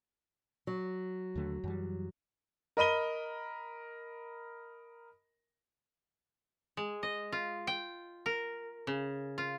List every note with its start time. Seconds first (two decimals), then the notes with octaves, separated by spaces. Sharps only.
0.67 F#3
1.35 D#2 D3 A3
1.64 F#2 E3 G3
2.77 A#4 D#5 B5 D#7 G7
6.77 G#3
7.03 D#5
7.32 F4
7.67 G5
8.26 A#4
8.87 C#3
9.38 F4